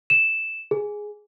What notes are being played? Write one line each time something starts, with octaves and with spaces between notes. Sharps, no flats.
E7
G#4